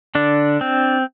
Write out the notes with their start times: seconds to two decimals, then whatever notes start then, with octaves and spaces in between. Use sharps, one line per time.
0.15 D3 D4
0.61 C4